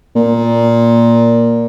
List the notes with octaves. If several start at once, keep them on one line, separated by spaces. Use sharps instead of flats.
A#2